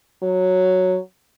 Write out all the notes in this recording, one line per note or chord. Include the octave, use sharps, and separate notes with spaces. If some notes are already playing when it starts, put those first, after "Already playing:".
F#3